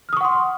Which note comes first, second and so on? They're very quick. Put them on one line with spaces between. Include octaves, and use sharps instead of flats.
F6 D#6 C#6 F#5 C6